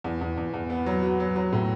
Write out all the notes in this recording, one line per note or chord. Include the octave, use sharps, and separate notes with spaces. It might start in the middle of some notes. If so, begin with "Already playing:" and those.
E2
E2
E2
E2
B3
F#3
F#4
F#3
F#3
A2